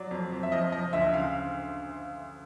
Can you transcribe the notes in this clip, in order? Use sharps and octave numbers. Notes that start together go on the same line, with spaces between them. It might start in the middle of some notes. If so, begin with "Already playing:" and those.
Already playing: F#3 D5
F2
F2
E5
F3 D#5
F3 D#5
D2 E5
C#3 F5